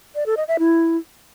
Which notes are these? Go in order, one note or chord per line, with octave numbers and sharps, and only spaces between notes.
D5
A4
D#5
E5
E4